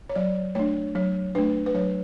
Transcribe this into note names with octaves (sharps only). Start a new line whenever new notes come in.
C#5
F#3 D5
A3 D4 C#5
F#3 C#5
A3 D4 B4
B4
F#3 C#5